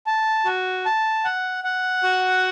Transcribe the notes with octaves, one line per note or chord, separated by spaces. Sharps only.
A5
F#4
A5
F#5
F#5
F#4